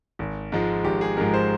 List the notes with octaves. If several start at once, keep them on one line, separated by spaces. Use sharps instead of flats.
G#1
G#2 F3 G#3
G#1 G4
G#4
G#2 F3 G#3 A#4
C5